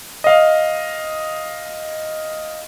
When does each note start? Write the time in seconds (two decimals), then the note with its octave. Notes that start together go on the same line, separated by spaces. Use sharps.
0.24 D#5 F5